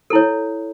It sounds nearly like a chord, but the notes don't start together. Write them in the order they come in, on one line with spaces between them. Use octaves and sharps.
A4 E4 C#5